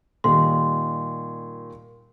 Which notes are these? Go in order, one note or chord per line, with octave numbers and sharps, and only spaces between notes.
A#2 D#3 G3 C6